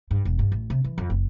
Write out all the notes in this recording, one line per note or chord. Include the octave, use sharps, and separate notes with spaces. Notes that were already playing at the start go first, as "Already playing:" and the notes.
G2
E1
G2
A1
C3
E3
F2
F#1